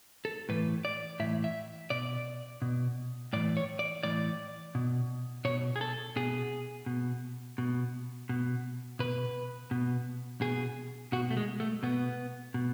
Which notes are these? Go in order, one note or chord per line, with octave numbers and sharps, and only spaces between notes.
A4
A2 E3 B4
D5
A2 E3 E5
E5
B2 D5
B2
A2 E3 D5
C#5
D5
A2 E3 D5
B2
B2 C#5
G#4
A4
B2 G#4
B2
B2
B2
B2 B4
B2
B2 G#4
B2 F#4
A3
G#3
A3
B2 B3
B2